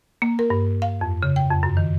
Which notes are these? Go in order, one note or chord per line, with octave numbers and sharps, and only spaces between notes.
A#3
A#4
G2
F5
F2
C#3
G5
F2
F#2
D#3